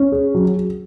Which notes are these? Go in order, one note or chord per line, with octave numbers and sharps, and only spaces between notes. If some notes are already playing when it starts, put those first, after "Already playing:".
Already playing: C#4
G#4
F#3